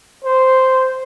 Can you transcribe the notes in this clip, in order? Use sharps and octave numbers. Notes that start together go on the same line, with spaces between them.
C5